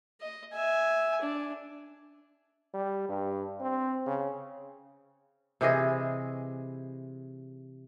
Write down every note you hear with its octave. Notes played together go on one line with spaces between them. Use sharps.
D#5
E5 G#5
D4
G3
G2
C4
C#3
C3 E3 G#4 D#5